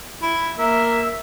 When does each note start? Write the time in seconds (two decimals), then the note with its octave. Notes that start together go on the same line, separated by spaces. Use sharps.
0.22 E4
0.58 A#3 E5